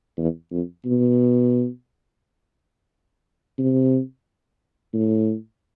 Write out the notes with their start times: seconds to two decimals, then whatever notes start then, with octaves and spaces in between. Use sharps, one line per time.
0.18 E2
0.51 F2
0.85 B2
3.58 C3
4.94 A2